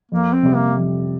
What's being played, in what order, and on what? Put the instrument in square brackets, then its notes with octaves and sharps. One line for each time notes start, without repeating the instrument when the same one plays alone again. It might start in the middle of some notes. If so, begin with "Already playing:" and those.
[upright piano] F2 [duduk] A#3
[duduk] C4
[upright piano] C3 G3
[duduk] A#3
[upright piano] F2